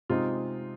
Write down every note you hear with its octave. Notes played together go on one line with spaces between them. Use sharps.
C3 G#3 C4 D#4 F4